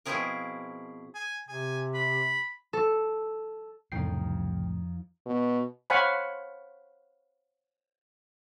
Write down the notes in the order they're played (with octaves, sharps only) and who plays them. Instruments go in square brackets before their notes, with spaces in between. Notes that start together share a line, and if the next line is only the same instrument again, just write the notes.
[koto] B2 F3 C4 E4 G#4 A#4
[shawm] G#5
[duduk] C3 [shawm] G#5
[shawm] B5
[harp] A4
[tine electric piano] C2 G5 C7 [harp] F2 F3 D#4 [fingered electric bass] A2 C#3
[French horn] B2
[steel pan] C5 C#5 F5 F#5 G#5 B5